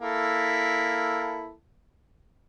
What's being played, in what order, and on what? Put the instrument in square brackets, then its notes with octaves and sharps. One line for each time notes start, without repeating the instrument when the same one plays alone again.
[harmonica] A#3 E4 A4